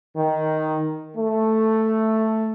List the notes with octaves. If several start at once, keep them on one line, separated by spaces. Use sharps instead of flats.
D#3
A3